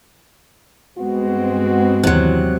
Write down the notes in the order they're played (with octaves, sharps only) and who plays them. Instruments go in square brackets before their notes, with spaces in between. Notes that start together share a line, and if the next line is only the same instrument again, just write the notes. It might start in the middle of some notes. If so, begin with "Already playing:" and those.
[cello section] G2 G#3 C4 [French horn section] B3 F#4
[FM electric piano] D#2 E3 F#6 [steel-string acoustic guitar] C3 F#3